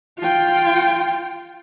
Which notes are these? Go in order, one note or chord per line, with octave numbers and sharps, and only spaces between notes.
F4 G5